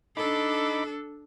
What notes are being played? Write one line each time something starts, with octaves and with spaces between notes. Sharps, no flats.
D4 D#4 A4 B5 D6